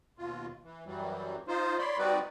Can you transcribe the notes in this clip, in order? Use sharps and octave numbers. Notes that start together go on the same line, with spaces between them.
D#2 B2 F4
E3
F#2 E3 F#3 G3
D#4 F4 C5
C#5 D5 B5 C6
G3 C4 D#4 F#4 B4 D5